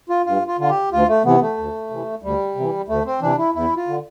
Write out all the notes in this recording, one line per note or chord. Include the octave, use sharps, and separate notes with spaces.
F4
G2 F4
F4
D3 F4
G4
D2 F4
A3
C3 E3 B3
A3
D2
C3 E3
D2 G3
C3 E3
D2 A3
C4
C3 E3 D4
E4
E2 E4
F4
D3